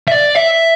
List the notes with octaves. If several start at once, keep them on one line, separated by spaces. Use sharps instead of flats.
E5
D5
E5